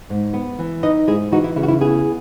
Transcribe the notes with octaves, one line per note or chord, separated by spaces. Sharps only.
G#2
B3
E3
D#4 B4 D#5
G#2 E4 G#4
E3 D#4 F#4
E4
C#3 E4
F#4
E4
B3 E4 G#4